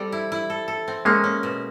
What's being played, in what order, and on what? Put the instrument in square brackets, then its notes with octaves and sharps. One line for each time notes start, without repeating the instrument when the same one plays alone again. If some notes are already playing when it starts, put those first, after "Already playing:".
Already playing: [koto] G3 C4 A4
E4
E4
A4
A4
C4
[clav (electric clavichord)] G#3 A#3 [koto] C#4
[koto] C#4
B2